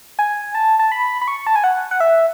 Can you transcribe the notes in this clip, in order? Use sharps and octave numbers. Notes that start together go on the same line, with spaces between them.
G#5
A5
A5
B5
B5
C#6
A5
G#5
F#5
F#5
E5